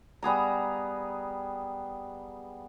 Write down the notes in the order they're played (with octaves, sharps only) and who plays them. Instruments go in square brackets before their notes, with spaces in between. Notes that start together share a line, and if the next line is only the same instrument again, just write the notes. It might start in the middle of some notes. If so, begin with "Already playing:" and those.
[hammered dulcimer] G3 B3 G#4 A#5